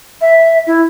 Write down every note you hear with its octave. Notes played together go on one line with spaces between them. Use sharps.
E5
E4